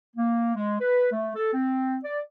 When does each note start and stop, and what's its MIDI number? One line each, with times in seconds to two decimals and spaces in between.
0.16 0.53 58
0.56 0.77 56
0.81 1.08 71
1.12 1.31 57
1.35 1.51 69
1.54 1.98 60
2.03 2.20 74